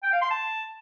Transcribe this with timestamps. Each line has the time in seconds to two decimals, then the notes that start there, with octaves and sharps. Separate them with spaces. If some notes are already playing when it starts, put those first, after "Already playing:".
0.03 G5
0.13 F5
0.22 C6
0.31 A5